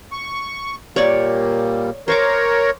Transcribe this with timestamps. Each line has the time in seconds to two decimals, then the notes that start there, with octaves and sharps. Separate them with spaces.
0.12 C#6
0.96 A#2 G3 A#3 C#5 D5
2.08 A#4 C5 C#5 C#6 D6